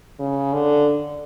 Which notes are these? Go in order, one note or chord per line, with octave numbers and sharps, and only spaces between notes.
C#3
D3